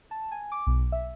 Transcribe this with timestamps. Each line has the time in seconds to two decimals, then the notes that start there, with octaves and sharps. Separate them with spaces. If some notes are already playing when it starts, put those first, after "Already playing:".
0.11 A5
0.32 G#5
0.52 D6
0.67 B1
0.92 E5